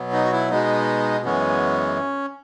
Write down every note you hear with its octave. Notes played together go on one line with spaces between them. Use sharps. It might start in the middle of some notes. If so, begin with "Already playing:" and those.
Already playing: B2 F#3 B3
D#4
F#4
E4
B2 G#3 B3 D#4
F#2 E3 G#3 B3 C#4